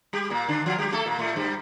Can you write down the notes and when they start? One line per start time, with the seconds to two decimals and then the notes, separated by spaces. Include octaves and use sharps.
0.13 G3 G4
0.30 A#2 A#3
0.49 D3 D4
0.66 F3 F4
0.78 G3 G4
0.93 A3 A4
1.05 A#2 A#3
1.19 A2 A3
1.36 G2 G3